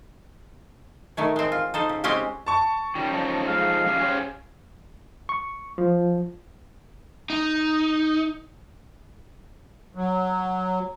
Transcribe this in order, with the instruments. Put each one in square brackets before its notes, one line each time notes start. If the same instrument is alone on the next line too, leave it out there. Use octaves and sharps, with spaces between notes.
[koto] D#3 A3 C#5
G#3 C4
F4
D#4 A4 C5
C#3
G#3 C4 C#4 F#4 G4
[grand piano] A5 C#6
[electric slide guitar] D#3 G3 [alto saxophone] C#4
[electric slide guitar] F3 D#4 A4
[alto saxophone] G#3 [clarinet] F5
[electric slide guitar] F3 C#4 G4
[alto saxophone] C#4 [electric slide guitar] G4 G#4 C5
[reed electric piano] C#6
F3
[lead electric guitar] D#4
[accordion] F#3